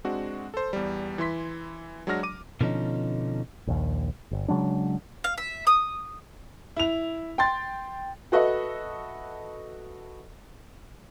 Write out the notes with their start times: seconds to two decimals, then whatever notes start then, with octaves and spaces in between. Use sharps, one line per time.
0.04 G#3 C4 D4 F#4
0.54 A4 C5
0.73 E2 G3
1.18 E3 E4 C6 B6
2.07 F#3 G#3 D4 F#4 F6 A#6
2.23 D6 D#7
2.61 B2 D3 F3 C#4 D#4
3.67 A#1 D#2
4.31 G1
4.48 C#3 F#3 G#3 D4
5.24 F5
5.38 E5
5.67 D#6
6.77 E4 F7
7.38 G5 C6 A6
8.32 F#4 A4 B4 D#5 E5